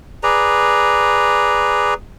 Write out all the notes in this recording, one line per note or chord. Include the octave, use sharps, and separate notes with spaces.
G#4 B4 D5 A#5